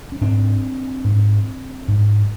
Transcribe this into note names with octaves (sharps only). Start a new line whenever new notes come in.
C#4
G#2 C4 D4
G#2
G#2